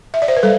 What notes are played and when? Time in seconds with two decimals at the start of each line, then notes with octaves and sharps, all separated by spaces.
0.14 E5
0.22 D5
0.28 C5
0.37 B4
0.43 G3 A4